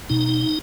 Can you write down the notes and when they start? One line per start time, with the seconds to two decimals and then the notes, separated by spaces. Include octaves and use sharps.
0.10 B2 D#4